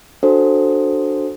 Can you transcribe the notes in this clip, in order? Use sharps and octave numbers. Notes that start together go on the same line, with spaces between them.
D4 F#4 A4 C5